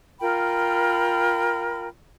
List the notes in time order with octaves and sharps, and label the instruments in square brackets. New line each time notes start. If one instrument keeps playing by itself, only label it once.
[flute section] F4 A#4 G5 B5